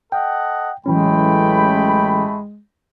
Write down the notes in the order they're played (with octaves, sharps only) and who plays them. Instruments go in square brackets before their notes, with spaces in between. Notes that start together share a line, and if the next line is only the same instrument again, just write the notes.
[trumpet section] A4 D#5 F#5 [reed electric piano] G5
[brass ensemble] A1 G5 [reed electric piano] E3 F#3 C#4 [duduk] G#3 [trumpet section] A3 B5